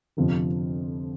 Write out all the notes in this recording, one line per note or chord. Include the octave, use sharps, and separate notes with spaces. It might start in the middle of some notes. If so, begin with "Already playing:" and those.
G1 F2 C3 F3